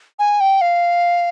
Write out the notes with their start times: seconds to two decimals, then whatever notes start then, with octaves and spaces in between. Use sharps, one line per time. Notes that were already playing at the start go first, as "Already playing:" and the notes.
0.19 G#5
0.40 G5
0.61 F5